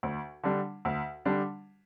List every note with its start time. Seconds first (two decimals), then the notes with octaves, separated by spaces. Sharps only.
0.03 D2
0.44 D3 G3 D4
0.85 D2
1.25 D3 G3 D4